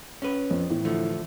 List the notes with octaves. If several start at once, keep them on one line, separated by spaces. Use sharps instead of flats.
C#4 B4
F2
A2 E3
D3 F3 A3